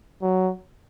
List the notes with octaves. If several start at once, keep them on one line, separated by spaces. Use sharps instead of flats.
F#3